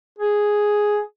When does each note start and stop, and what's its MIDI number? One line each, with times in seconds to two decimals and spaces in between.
0.19 0.99 68